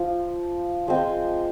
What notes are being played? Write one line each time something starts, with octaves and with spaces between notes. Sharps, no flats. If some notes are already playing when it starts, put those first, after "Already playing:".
Already playing: F3 F4
F3 G#3 C4